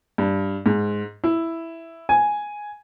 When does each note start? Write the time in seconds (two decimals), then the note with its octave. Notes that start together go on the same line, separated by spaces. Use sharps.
0.18 G2
0.66 G#2
1.24 E4
2.09 G#5